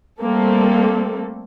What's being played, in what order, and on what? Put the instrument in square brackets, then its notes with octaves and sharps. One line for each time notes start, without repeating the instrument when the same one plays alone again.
[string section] G3 A3 A#3 C4 A4